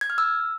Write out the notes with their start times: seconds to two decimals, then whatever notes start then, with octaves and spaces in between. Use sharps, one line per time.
0.01 G#6
0.10 F6
0.18 E6